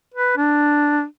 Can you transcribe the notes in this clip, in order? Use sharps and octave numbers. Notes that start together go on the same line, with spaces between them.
B4
D4